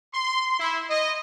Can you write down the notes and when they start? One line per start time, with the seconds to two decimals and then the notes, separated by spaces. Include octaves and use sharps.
0.14 C6
0.60 E4
0.90 D#5